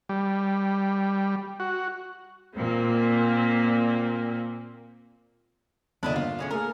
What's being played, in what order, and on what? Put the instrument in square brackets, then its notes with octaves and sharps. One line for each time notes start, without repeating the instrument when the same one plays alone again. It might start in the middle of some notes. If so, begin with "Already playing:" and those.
[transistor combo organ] G3
F#4
[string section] A#2 A#3 C4
[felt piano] E2 A#2 D3 [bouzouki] D4 E4 D#5
[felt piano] G1 [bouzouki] F4
[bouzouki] A2 G#3 C#4
[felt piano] A3 A#3 G#4 [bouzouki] A#4